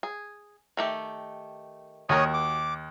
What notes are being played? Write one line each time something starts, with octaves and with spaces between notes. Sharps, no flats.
G#4
D#3 A3 G4
D#2 F#4 A#4 C#5 D#6
D6